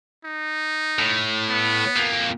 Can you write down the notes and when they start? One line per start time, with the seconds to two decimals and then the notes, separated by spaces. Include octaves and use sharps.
0.24 D#4
0.99 A2
1.49 B3
1.97 F2 A#3